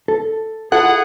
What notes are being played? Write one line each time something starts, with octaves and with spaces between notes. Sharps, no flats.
A4
E4 F4 G#4 A4 F#5